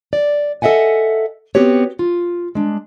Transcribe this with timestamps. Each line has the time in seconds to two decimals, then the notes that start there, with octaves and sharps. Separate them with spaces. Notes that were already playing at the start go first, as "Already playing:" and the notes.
0.13 D5
0.62 A4 D#5 E5 F#5 G#5
1.55 B3 C4 F#4 G4 C#5
1.99 F4
2.55 G#3 D4